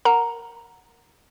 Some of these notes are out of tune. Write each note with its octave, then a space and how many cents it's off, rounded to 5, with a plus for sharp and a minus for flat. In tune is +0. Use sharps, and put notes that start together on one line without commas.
A#4 +0 F#5 -5 A#5 +0